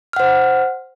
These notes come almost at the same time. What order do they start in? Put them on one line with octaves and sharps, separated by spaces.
F6 F#5 C5